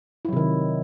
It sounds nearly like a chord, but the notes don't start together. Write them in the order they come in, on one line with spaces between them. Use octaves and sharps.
E4 F#3 C3 D#3